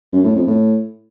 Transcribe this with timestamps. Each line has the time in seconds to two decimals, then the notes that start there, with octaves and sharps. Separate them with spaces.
0.13 F#2
0.24 A2
0.35 F2
0.47 A2